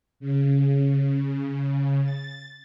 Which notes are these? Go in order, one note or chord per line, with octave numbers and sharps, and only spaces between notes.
C#3
A6